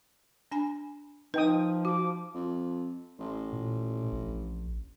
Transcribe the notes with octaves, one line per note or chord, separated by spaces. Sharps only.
D4 G#5 B5
F3 D#4 B4 G5 D#6
F#4 D6
F2
A1
A#2
A#1